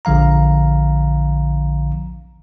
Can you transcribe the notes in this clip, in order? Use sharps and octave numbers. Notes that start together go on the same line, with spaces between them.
A#1 D3 F3 F5 A#5